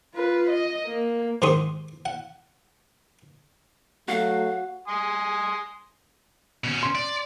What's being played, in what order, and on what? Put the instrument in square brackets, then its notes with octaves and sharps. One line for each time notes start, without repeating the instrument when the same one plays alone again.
[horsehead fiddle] F4 B4
D#5
A#3
[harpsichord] G#2 D#3 G4 C6 C#6 D#6
F#5
[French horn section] F#3 A3 [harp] F#4 [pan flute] F5
[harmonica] G#5 C6 D#6
[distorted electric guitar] B2 C#4
[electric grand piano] C6
[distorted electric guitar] D5